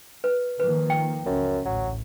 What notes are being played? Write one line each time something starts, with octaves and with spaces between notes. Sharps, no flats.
B4
D#3 F3 A#3 B4
G5
C#2 F#2 C#4
A1 D2 F#3